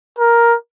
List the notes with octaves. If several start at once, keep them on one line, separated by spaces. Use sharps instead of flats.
A#4